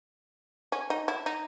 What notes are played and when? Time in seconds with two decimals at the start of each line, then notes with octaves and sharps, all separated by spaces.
0.72 C#4
0.90 D#4
1.08 E4
1.26 D#4